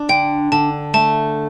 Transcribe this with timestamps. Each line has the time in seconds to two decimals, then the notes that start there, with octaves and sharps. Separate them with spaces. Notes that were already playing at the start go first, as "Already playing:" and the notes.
Already playing: D4
0.09 D3 G5
0.52 D3 A5
0.94 A3 A5